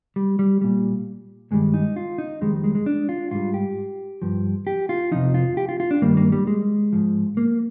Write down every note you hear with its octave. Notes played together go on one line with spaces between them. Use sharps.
G3
G3
A#2 G3
G2 D#3 G3 G#3
D#4
F4
D#4
F2 D#3 G3 G#3
G#3
G#3
D4
F4
G#2 G3 F4
G4
G2 F3
G4
F4
F2 C3 F3 D#4
F4
G4
F4
F4
D4
G2 D#3 G3 A#3
A#3
G3
G#3
G#2 F3
A#3